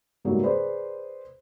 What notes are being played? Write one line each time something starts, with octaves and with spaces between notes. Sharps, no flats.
G#2 C#3 F#3 G3 A3 A#3
G#4 B4 C5 D5